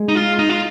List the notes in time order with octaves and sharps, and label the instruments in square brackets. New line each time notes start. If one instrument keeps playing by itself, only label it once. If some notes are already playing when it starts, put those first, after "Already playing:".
Already playing: [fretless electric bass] G#3
[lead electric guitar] D#4
F4
D#4
F4